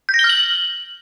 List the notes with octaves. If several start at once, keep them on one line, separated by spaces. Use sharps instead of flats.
G6
A#6
G7
F6
F#7